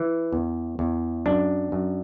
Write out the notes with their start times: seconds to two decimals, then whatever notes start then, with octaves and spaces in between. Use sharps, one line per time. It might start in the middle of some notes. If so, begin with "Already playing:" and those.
Already playing: E3
0.33 E2
0.79 E2
1.26 F#2 D4
1.72 F#2